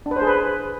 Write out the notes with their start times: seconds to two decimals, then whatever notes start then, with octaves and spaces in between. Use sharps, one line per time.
0.06 D4
0.11 B4
0.16 C5
0.22 G#4
0.27 B4